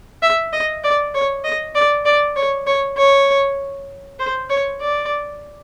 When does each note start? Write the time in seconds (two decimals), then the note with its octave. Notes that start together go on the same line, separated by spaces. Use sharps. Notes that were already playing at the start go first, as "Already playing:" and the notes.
0.22 E5
0.53 D#5
0.83 D5
1.14 C#5
1.44 D#5
1.75 D5
2.06 D5
2.36 C#5
2.67 C#5
2.97 C#5
4.19 C5
4.50 C#5
4.81 D5